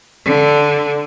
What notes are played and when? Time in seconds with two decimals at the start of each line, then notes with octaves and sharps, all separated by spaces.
0.25 D3